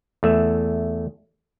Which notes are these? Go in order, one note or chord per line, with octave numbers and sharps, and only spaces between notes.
E2 A3 E5